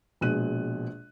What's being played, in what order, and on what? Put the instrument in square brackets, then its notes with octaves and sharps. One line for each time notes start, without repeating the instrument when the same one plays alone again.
[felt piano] A#1 B2 G#3 G#4 F#6 D#7